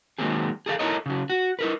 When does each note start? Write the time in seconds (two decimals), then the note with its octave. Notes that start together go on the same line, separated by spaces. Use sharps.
0.19 D#3 F#3 G#3 A#3 C4 G#4
0.66 G#4 A4 D5 F5
0.79 E4 F#4 A4 A#4 C#5 D#5
1.06 C#3 F#3
1.30 F#4
1.59 E4 A#4 B4